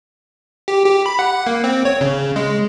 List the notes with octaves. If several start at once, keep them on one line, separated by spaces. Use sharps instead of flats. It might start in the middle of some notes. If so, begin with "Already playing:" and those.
G4
G4
B5
F#5
A#3
C4
C#5
C#3
G#3